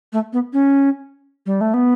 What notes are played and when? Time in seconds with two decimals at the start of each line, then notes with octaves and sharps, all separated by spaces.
0.13 A3
0.33 B3
0.53 C#4
1.46 G3
1.61 A3
1.74 B3